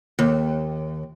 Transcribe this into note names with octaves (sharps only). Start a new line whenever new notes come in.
D#2